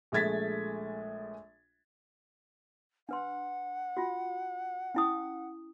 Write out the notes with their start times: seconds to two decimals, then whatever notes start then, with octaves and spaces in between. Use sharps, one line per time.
0.12 A#1 G#3 A3 G#6 A6 B6
3.09 D4 B4 F#5 C6
3.97 F4 F#4
4.95 C#4 E4 D#6